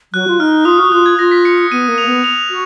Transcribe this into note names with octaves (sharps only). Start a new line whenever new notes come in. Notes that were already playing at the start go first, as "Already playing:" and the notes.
F#3 F#6
F4
D#4 F6
F4 D#6
F#4 F6
F4 F#6
G#6
F4 A#6
B6
C#7
C#7
B3 D#7
A#3
F7
B3
F7
F#4